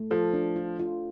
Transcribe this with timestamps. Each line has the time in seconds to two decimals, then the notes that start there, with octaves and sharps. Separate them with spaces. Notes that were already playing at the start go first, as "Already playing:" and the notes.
Already playing: A3
0.11 F3 A4
0.34 D4
0.56 F4
0.79 F4